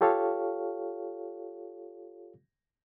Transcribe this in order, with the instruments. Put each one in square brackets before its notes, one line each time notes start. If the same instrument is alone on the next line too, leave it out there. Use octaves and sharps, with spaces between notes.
[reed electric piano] F4 G4 A4 C#5 F5